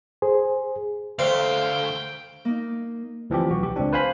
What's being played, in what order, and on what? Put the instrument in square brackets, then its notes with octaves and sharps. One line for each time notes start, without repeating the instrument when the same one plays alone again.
[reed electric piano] G#4 C5
[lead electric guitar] D2 A3 [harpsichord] C5 [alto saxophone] F5 [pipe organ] G5
[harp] A#3 D#4
[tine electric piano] D2 E3 F3 C4 G4
B1 F#4
G4
C#2 C4 D4
B4 C5 F5 G#5 B5